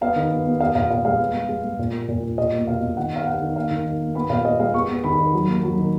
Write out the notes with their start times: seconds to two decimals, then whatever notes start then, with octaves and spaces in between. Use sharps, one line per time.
0.01 B3 F5
0.16 D#3
0.31 B3
0.46 B3
0.60 B3 F5
0.75 A#2 F5
0.90 A#2 F5
1.05 G#3 F5
1.19 B3
1.34 G#3
1.49 G#3
1.64 G#3
1.79 A#2
1.93 A#3
2.08 A#2
2.23 A#2
2.38 B2 D#5
2.52 A#3
2.67 B2 F5
2.82 B2
2.97 D#3 F#5
3.12 B3 F5
3.27 B3 F#5
3.42 D#3
3.56 A#3 F5
3.71 D#3
3.86 D#3
4.00 A#3
4.15 B3 B5
4.29 A#2 F5
4.45 B3 D#5
4.59 G#3 F5
4.74 B3 C#6
4.89 B3
5.04 D#3 B5
5.19 D#3
5.33 F#3
5.48 A#3
5.63 F#3
5.78 D#3